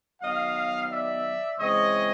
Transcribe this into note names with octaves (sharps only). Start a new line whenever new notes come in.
D#3 F#3 B3 D#5 F5
D5 E5
C#3 E3 G#3 C4 C#5 D#5